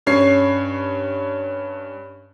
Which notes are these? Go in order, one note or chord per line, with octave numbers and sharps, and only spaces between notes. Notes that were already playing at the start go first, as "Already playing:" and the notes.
G2 C#4 C#5 C7